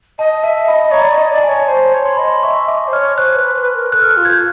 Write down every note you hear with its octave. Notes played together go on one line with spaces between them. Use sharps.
D#5 A5
E5 A5
D#5 B5
B5
C#5 A#5
D5
D#5
A5
D5
A5
G#5
C#5
C5 A5
C#5
C6
D#5 B5
C6
E5 C#6
D#5 D6
C5
C#5 F6
C#5
C5 F#6
B4
B4
A#4
A4 F#6
F6
F#6
F4
G#6
G6